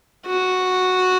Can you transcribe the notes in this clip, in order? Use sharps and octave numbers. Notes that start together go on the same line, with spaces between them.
F#4